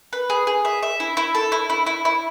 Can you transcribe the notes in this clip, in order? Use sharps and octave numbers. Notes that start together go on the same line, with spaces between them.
B4
G#4
G#4
E5
E5
E4
E4
A4
E4
E4
E4
E4